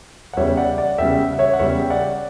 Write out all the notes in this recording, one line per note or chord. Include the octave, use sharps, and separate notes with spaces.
F#5
E2 C#3 G3 C#5 E5
D5 F#5
D5 F#5
E2 C#3 G3 E5 G5
F#5
C#5 E5
F#5
E2 C#3 G3 C#5 E5
G5
D5 F#5